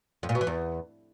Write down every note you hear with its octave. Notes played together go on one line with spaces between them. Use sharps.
F2
A#2
B2
E3
E2